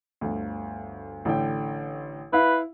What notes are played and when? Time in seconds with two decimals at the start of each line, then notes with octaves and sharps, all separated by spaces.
0.21 G1 D2
1.25 A1 D3 G5
2.33 E4 B4 F5